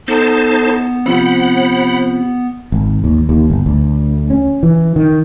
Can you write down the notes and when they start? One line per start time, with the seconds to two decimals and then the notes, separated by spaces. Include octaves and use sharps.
0.08 B3 D#4 A4 C5 A5
1.06 C3 F3 C4 C5 F#5 B5
2.72 G#1
3.04 D#2
3.29 D#2
3.50 G1
3.66 D2
4.30 C#4
4.63 E3
4.96 D#3